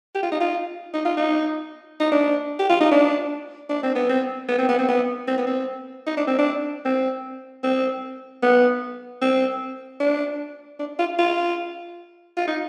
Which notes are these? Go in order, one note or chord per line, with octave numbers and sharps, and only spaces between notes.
G4
F4
D#4
F4
D#4
F4
D#4
D#4
D4
G4
F4
D#4
D4
D4
C4
B3
C4
B3
C4
B3
C4
B3
C4
B3
C4
D#4
D4
C4
D4
C4
C4
B3
C4
D4
D4
F4
F4
F4
D#4